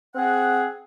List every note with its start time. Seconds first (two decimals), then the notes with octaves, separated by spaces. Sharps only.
0.15 C4 G#4 F#5